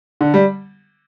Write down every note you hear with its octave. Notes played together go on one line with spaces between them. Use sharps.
D3
G3